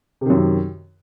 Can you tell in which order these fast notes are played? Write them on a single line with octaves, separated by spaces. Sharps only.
C3 D#3 F#2